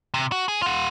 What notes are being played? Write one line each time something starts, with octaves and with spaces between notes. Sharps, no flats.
C3
F#4
G#4
F4 F#5